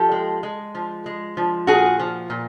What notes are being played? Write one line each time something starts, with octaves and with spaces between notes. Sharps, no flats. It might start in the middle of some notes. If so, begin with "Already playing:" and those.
Already playing: F3 G4 A4
G#3
G#3
F3
G#3
F3
A#2 F#4 G#4
F3
A#2